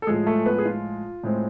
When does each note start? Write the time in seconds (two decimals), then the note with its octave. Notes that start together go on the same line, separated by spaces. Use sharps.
0.02 A4
0.07 A2 F3 G#3 G#4
0.27 A3 A4
0.46 B3 B4
0.59 G#4
0.65 F4
1.23 A2 G#3 C4